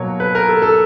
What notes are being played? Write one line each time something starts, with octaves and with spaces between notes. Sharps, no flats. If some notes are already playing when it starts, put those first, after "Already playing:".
Already playing: B2 F#3 A#3 C#5
B4
A#4
A4
A4